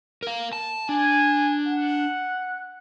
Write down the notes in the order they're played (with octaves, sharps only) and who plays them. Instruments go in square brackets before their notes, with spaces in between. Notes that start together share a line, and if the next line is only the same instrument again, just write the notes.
[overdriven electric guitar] A#4 F5
A5
[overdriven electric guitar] D4 [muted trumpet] G#5
[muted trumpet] F#5